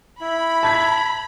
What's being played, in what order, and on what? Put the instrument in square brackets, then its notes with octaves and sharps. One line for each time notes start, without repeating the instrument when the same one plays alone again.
[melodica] E4 [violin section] B5
[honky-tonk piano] A5 G#6 B6